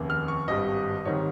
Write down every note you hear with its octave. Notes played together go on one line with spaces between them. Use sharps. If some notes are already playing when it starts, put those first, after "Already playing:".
Already playing: F1 D#2 C#3
F6
C#6
G#1 G2 G3 D#5
G#1 G#2 D#3 G3 C#5